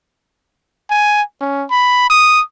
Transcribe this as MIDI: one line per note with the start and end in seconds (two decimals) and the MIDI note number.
0.90 1.22 80
1.41 1.65 61
1.70 2.07 83
2.10 2.42 87